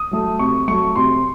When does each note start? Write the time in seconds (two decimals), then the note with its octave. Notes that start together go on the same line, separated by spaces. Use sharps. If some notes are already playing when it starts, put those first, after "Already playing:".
Already playing: D#6
0.11 F#3 A3
0.39 C3 C#6
0.68 F#3 A3 C#6
0.96 C3 C6